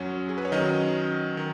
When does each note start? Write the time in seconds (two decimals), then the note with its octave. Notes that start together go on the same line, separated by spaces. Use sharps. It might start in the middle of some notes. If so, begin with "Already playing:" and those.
Already playing: F#2 F#3 C#4 F#5
0.29 G#4
0.38 B4
0.45 C#5
0.52 D#3 F#3 C#4 D#5
1.37 D#3